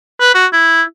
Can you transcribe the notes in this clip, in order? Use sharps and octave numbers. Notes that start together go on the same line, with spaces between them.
B4
F#4
E4